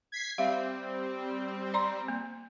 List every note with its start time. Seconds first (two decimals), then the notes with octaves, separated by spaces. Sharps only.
0.12 G#6 B6 C7
0.38 G3 C4 E5 F5
1.74 D5 A#5 C6
2.08 A#3